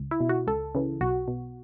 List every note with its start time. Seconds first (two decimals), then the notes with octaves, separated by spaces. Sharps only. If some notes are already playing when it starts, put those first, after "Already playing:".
Already playing: C#2
0.11 E4
0.20 B2
0.29 F#4
0.47 C#2 A4
0.75 C#3 E3
1.01 B1 F#4
1.28 B2